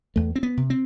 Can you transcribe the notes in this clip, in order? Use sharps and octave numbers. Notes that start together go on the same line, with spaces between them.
E2 A3
C4
B3
C3
C4